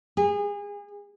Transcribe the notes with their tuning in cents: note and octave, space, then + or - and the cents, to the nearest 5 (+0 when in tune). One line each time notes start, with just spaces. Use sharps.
G#4 -30